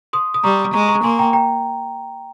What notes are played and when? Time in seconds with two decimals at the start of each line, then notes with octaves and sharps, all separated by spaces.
0.13 C6 D#6
0.34 D#6
0.43 G3 A#5 C#6
0.74 G#3 A#5 C#6
0.88 A#5 C#6
1.04 A#3 G#5 C6
1.19 G5 A#5
1.33 G5 A#5